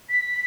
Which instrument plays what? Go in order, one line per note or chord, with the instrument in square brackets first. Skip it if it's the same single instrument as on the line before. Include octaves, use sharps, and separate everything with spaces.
[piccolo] B6